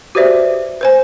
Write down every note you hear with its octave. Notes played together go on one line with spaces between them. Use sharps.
F#4 G4 B4 C5 D5 E5
B4 C5 G#5